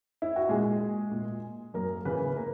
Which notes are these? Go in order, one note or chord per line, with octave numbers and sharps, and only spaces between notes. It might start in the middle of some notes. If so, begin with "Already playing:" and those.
E4
F#4
A#2 G#3 G#4
A#2
F#2 A#3 A#4
C#3 E3 B3 B4
A#3 A#4